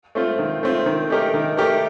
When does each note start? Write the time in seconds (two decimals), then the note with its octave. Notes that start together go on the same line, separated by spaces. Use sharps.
0.15 A3 C4 F4
0.39 D#3
0.63 A3 C4 F4
0.86 D#3
1.10 A3 D#4 G4 A#4
1.34 D#3
1.57 A3 D#4 G4 A#4